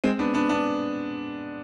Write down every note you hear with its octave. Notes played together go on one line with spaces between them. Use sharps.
G#3 C4
B3 D4
B3 D4
B3 D4